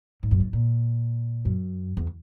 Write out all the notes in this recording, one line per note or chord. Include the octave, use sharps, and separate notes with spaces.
G#2
F#2
G#2
A#2
F#2
E2